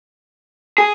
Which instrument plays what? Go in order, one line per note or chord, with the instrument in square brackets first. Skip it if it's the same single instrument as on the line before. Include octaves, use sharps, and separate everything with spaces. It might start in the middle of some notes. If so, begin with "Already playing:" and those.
[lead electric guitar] G#4